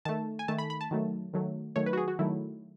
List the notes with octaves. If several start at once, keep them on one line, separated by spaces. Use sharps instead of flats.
D#3 A3 A5
G#5
D#3 A3 A5
B5
B5
A5
D#3 F#3 A3
D#3 F#3 A3
D#3 F#3 A3 C#5
B4
F#4
G#4
F#4
D#3 F#3 A3 E4